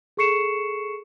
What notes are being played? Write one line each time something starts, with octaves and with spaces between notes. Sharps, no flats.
G#4 A4 C#6 C7 C#7 E7